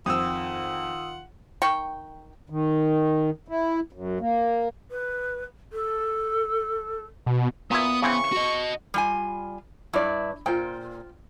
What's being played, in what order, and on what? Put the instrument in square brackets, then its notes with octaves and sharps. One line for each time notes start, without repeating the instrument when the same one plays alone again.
[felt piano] F2 C4 [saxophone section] D#3 F4 F#5 [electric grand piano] D#6 E6
[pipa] D#3 G5 C#6
[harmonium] D#3
E4
F#2
A#3
[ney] B4
A4
[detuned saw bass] B2
[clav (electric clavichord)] A#2 E4 [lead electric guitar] B3 [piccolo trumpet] D#6
[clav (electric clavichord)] C#3 E3 C4 [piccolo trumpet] C#6
[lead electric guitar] F#4 D#5
[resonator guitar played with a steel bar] G3 F4 G#5
[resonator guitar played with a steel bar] G2 [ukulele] E4 D5
[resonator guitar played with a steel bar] A#2 [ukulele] F4 C5 G5